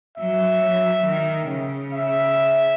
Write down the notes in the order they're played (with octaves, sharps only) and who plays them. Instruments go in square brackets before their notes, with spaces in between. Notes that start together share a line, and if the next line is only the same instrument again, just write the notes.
[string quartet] F#3 [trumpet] E5
[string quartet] F#3
D#3
C#3
[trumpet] E5